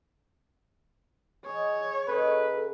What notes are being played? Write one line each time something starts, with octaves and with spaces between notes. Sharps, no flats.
G#4 C#5 D#5
C#3 D#4 A4 B4